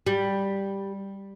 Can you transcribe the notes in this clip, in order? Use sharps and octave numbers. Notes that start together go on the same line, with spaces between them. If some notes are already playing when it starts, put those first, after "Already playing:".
G3